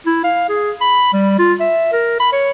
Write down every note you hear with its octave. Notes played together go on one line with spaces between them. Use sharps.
E4
F5
G#4
B5
G3
F4
E5
A#4
B5
C#5